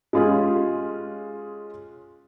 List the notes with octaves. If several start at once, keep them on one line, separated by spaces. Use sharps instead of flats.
G#3 C#4 F4 G4 G#4